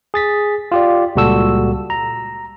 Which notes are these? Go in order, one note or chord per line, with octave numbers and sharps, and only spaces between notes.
G#4 A6 B6
F4 G4 D5
C#2 A#2 G3 F#4 A4 E6
A#5